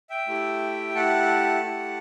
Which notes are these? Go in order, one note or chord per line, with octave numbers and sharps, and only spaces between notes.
E5 G5
A3 E4 G4
A3 E4 G4 F#5 A5
A3 E4 G4